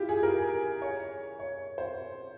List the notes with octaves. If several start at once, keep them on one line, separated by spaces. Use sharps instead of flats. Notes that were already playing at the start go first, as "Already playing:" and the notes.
Already playing: E4 F4 G4
G#4
A#4
C#5
C#5
C5